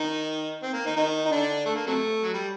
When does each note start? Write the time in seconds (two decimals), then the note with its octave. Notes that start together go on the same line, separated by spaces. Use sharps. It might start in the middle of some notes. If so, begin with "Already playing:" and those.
Already playing: D#3 D#4
0.63 C4
0.74 A#3
0.85 D#3 D#4
0.96 D#3 D#4
1.26 D#4
1.31 D3 D4
1.66 A3
1.76 A#3
1.87 C3 F#3 A3
2.23 F#3
2.33 G3